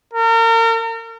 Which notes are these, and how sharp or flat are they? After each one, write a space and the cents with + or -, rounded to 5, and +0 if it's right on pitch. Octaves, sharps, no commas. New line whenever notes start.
A#4 -35